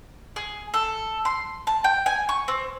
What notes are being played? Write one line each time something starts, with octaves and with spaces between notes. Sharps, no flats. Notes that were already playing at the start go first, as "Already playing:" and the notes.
G#4
A4
C6
A5
G5
G#5
C#6
C4